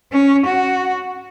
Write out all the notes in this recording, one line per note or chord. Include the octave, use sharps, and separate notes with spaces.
C#4
F#4